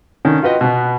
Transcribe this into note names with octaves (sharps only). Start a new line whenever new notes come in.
D3 D#3 C#4
F4 F#4 B4 D#5 G5
B2 B3